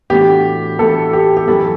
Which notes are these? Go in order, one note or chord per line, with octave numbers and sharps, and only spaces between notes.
A2 E3 B3 D4 F#4 G4
A2 E3 B3 D4 F#4 A4
G4
G4
F#2 E3 B3 E4 A4